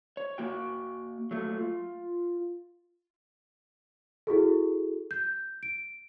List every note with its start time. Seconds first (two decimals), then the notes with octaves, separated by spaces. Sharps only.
0.17 C#5
0.38 A#3 F#4 G5
1.31 F#3 A3 A#3
1.58 F4
4.27 E4 F#4 G#4 A4
5.11 G6
5.63 D7